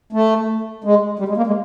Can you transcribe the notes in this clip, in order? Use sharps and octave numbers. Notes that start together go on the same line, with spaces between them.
A3
G#3
G3
G#3
A#3
G#3